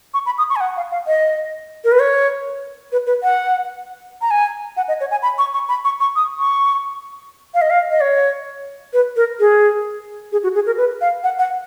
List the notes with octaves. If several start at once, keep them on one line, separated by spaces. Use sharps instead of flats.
C#6
B5
D#6
C#6
G#5
F#5
F5
F5
D#5
A#4
B4
C#5
B4
B4
F#5
A#5
G#5
F#5
D#5
C#5
G#5
B5
C#6
C#6
B5
C#6
C#6
D#6
C#6
F5
D#5
F5
D#5
C#5
B4
A#4
G#4
G#4
F#4
G#4
A#4
B4
F5
F#5
F#5